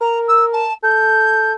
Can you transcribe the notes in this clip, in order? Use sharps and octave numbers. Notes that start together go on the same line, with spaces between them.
A#4 A#5
E6
A5
A4 G6